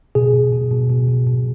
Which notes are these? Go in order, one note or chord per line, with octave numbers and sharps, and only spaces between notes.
B2 G#4
B2
B2
B2
B2
B2
B2